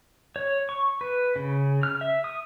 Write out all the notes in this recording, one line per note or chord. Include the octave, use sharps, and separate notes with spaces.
C#5
C#6
B4
C#3
F6
E5
D#6